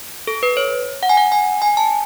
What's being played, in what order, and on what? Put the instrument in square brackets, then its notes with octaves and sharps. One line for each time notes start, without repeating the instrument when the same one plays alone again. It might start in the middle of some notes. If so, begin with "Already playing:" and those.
[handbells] A4
B4
C#5
F#5
G#5
F#5
G#5
G#5
A5